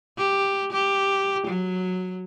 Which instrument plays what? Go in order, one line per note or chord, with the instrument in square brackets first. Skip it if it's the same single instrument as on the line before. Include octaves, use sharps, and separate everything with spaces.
[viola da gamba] G4
G4
F#3